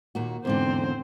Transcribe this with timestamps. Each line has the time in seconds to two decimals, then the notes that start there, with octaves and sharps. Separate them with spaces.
0.15 D#2 A#2 F#4
0.45 E2 G#2 D3 C4 C5